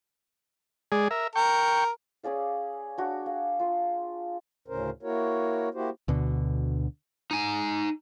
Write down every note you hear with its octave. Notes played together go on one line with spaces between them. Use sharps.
G#3 G#4 D5
A#4 E5
A#4 G5 C#6
C#4 G#4 D5 F5
D4 F#4
F5
F4 C6
D2 A2 C#3 C#4 A#4 C5
A#3 E4 F#4 A#4 C#5
A#3 E4 F#4 G4 C5
D2 B2 D3
D#4 G#5